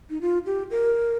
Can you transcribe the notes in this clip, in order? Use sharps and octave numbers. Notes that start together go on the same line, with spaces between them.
D#4
F4
G4
A#4